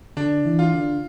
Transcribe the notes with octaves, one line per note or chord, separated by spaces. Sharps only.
D3 D4
E3
F4
D3